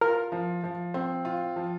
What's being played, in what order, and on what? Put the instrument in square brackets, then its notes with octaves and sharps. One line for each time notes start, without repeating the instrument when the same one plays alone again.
[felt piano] F4 [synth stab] A#4
[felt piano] F3
F3
C4
F4
F3